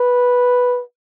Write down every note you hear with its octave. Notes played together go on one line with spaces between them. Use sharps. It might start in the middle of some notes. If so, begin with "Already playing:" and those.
Already playing: B4